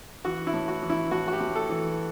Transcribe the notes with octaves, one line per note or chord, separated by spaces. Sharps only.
E3 F#4
E4
A2
F#4
E3
E4
A2 F#4
F#4
G4
A2
A4
E3